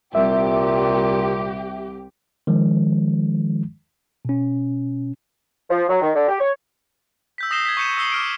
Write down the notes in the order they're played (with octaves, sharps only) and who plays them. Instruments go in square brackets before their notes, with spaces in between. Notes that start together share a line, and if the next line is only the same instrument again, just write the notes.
[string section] C2 G4 [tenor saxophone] A#2 [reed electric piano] E5
[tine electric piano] D#3 F3 G#3
B2 C#4
[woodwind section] F3
F#3
D#3
D3
G4
C#5
[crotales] E6 G6 B6
D#6 A#6 C7 E7 G7
G#6 B6
C#6 G6 C#7 D#7 E7
D#6 E6 C7 G7
D6 F6 D7